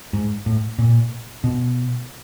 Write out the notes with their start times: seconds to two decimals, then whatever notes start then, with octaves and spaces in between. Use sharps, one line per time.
0.13 G#2
0.46 A2
0.79 A#2
1.44 B2